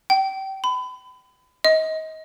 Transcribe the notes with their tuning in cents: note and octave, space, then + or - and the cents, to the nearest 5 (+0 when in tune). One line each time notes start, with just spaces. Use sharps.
G5 -25
B5 +35
D#5 +30